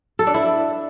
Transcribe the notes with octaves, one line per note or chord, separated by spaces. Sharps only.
A4
D4
E4